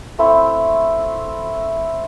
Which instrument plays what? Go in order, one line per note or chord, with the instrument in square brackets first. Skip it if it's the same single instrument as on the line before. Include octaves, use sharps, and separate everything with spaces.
[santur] A3 C4 E4